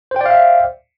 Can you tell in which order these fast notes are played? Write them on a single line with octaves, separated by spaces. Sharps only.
C5 G5 D5 F5 E5